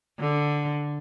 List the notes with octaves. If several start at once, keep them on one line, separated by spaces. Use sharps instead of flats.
D3